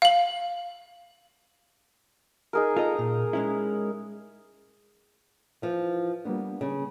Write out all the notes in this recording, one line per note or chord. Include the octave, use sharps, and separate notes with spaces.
F5 F#7
D#4 G#4 A#4
F4 A4 D#5 A#5
A#2
G#3 C#4 E4
E3 F3
G3 A#3 B3 D4
C#3